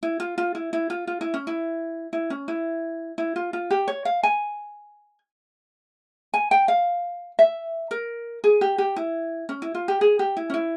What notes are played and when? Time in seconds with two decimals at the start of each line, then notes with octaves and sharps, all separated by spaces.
0.03 E4
0.20 F4
0.38 F4
0.55 E4
0.73 E4
0.90 F4
1.07 F4
1.21 E4
1.34 C#4
1.47 E4
2.13 E4
2.30 C#4
2.48 E4
3.18 E4
3.36 F4
3.53 F4
3.71 G4
3.88 C#5
4.05 F5
4.23 G#5
6.34 G#5
6.51 G5
6.68 F5
7.39 E5
7.91 A#4
8.44 G#4
8.61 G4
8.78 G4
8.96 E4
9.49 C#4
9.62 E4
9.75 F4
9.88 G4
10.01 G#4
10.19 G4
10.37 E4
10.50 C#4
10.54 E4